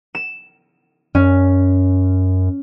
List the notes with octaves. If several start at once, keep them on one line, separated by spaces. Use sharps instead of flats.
E7
F#2 C#4